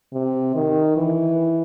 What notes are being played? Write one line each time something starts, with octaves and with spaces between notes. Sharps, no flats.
C3
D#3
E3